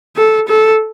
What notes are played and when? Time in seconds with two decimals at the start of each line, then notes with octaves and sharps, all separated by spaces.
0.17 A4
0.48 A4